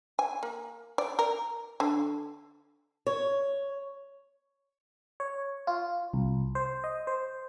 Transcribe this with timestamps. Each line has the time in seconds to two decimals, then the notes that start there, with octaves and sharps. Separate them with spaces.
0.19 G#5
0.43 A#3
0.98 D5
1.19 A#4
1.80 D3
3.07 C#5
5.20 C#5
5.67 F4
6.14 C2
6.55 C5
6.84 D#5
7.07 C5